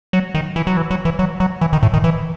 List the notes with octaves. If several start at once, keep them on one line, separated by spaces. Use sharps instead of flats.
F#3
D#3
E3
F#3
E3
F#3
E3
F#3
F#3
E3
D#3
A2
D#3
E3